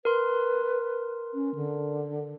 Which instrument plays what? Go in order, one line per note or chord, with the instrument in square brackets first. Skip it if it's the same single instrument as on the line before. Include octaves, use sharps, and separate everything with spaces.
[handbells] A#4 C6 [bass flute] B4
[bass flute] C#4
D3